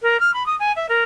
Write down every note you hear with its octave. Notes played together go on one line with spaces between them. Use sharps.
A#4
F6
B5
D#6
G#5
E5
A#4